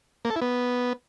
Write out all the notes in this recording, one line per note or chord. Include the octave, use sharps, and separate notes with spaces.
A#3
A4
E4
B3